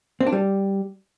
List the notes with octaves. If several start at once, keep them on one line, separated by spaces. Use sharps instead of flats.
C4
D4
G3